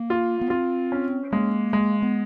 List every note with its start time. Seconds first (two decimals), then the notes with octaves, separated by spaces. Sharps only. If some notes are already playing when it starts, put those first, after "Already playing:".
Already playing: A#3
0.10 F4
0.41 B3
0.50 C4 F4
0.92 C#4
1.32 G#3 A#3
1.73 G#3
2.02 B3